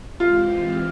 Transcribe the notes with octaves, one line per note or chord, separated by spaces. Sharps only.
E3 G#3 C4 F4 G4